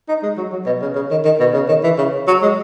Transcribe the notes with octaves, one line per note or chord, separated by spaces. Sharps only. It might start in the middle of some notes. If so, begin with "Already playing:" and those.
D#4
G#3
F#3
F#3
B2
C#3
C#3
D#3
D#3
B2
C#3
D#3
E3
C#3
F#3
G#3